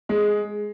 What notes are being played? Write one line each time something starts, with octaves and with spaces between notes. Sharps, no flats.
G#3